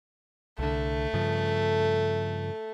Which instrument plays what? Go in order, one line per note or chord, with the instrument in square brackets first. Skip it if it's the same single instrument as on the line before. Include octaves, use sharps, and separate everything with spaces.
[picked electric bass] C2 D3 [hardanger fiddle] A3
[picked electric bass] G2 C#3 F3